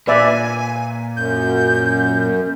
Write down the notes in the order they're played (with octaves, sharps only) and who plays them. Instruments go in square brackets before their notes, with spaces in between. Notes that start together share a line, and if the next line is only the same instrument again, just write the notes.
[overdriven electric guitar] A#2 [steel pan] B4 D5 E5 [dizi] G#5
[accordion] F#2 [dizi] G6